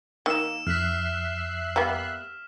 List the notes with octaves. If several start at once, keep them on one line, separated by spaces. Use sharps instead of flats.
D#3 A#3 E6 E7
F2 E5 F6 F#6 B6 C7
G3 A#3 B3